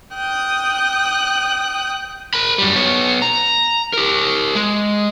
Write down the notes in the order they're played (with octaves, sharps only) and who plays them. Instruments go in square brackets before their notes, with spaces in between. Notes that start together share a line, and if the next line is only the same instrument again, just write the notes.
[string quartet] G5 D#6 F#6
[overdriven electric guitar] A#4 B5
F#2 G3
B3 C#5
A#5
G4 A#4
G#3